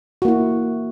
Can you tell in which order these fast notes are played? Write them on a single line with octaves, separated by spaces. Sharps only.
F#4 A#3 E4